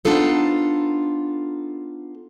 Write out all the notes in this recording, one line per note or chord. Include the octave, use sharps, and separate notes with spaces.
B3 D4 D#4 F4 A4 C5